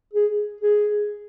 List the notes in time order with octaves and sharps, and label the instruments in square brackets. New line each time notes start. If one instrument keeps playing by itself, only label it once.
[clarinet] G#4
G#4